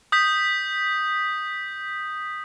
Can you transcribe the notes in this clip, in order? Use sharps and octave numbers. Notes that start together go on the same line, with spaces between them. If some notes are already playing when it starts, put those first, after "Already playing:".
D#6 G6 B6